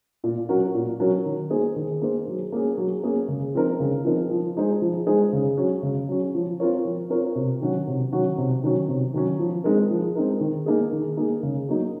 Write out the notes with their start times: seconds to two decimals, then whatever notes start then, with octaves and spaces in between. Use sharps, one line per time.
0.24 A#2
0.49 F#3 C#4 F#4 A#4
0.75 A#2
1.00 F#3 C#4 F#4 A#4
1.26 D#3
1.50 A#3 D#4 G#4 C5
1.76 D#3
2.02 A#3 D#4 G#4 C5
2.27 F#3
2.52 A#3 C#4 G#4
2.77 F#3
3.03 A#3 C#4 G#4
3.28 C#3
3.54 F3 C4 D#4 A#4
3.80 C#3
4.04 F3 C4 D#4 A#4
4.30 F3
4.56 G#3 D#4 G#4 C5
4.82 F3
5.06 G#3 D#4 G#4 C5
5.33 C#3
5.57 F#3 C#4
5.83 C#3
6.09 F#3 C#4
6.35 F3
6.60 C4 F4 A#4 C#5
6.85 F3
7.10 C4 F4 A#4 C#5
7.35 C3
7.61 D#3 F#3 C#4 F#4
7.87 C3
8.13 D#3 F#3 C#4 F#4
8.38 C3
8.64 D#3 F#3 C#4
8.88 C3
9.14 D#3 F#3 C#4
9.39 F3
9.64 G#3 C4 D#4 A#4
9.90 F3
10.15 G#3 C4 D#4 A#4
10.40 D#3
10.66 A#3 D#4 G#4
10.92 D#3
11.17 A#3 D#4 G#4
11.43 C#3
11.68 F#3 A#3 D#4